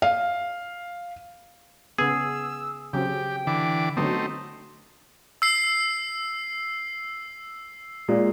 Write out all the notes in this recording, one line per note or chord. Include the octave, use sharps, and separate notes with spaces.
F5
C#3 B3 G#4 E6
C#3 F#3 C4 G4 G5
D3 E3 D6
D3 F#3 A3 B3 C4 D#4 F#4
E6 C7
A#2 G#3